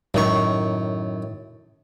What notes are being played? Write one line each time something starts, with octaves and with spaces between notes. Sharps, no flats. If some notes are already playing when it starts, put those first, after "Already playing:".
F#2 A2 D#3 C#6